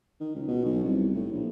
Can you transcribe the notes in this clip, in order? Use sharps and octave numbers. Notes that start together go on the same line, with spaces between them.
D#3
C#2
B2
B1
C2
A2
A#1